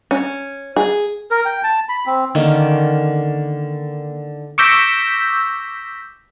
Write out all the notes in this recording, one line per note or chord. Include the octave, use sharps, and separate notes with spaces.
C#4
G#4
A#4
G5
A5
B5
C4
D3 D#3 A#3 C#4
C#6 D6 E6 G6 A#6 B6